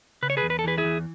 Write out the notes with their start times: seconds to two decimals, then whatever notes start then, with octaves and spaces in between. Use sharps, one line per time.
0.23 C#3 B4
0.30 C#5
0.37 G#4 B4
0.43 E2
0.50 B4
0.59 A4
0.64 E3 G#4 B4
0.78 E4 G#4
0.85 E2